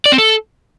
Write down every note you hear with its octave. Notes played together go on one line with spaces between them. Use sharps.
D5
C4
A4